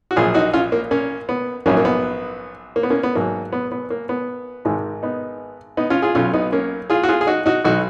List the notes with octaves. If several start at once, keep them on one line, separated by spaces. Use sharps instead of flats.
F#4
A#1 A#2 F#3 F4 G#4
D#4 F#4
C#4 F4
A#3
A#3 C#4
B3
A#1 G#2 F#3 A#3 C#4
A#3
B3
A#3
B3
A#3 C#4
B3
G#1 G#2 F#3 A#3
B3
B3
A#3
B3
G#1 G#2 D#3 G#3
B3 D#4
B3 D#4
C#4 F4
F4 G#4
B1 B2 F#3 C#4 F4
B3 D#4
A#3 C#4
F4 G#4
F#4
F4 G#4
G#4
D#4 F#4
D#4 F#4
B1 B2 F#3 D#4 F#4